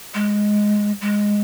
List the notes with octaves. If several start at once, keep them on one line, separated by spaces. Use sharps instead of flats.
G#3
G#3